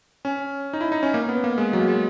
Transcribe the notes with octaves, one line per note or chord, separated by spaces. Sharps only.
C#4
D#4
E4
D#4
C#4
A#3
B3
A#3
G#3
F#3
A#3
G#3